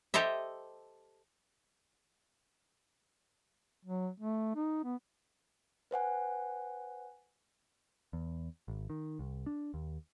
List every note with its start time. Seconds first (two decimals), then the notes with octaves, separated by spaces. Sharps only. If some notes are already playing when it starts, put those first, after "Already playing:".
0.14 G4 A4 C5 D#5 E5
3.85 F#3
4.20 A3
4.55 D#4
4.84 B3
5.91 B4 C5 F#5 G#5
8.13 E2
8.68 G#1
8.90 D#3
9.19 C2
9.46 D4
9.74 D#2